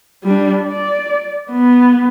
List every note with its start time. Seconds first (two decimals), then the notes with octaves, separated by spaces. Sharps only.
0.24 G3 D4
0.64 D5
1.51 B3